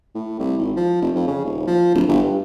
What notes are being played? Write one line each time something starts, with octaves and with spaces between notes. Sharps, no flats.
A2
C2
G#1
F3
F1
F2
C#3
D#1
F3
D1
G1
G2